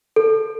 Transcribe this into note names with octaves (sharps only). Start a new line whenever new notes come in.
A4